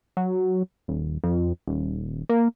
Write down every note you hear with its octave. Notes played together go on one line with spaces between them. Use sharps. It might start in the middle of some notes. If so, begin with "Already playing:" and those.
F#3
D#1
F2
D#1
A#3